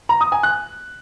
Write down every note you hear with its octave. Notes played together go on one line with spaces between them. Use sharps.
A#5
D#6
G#5
F#6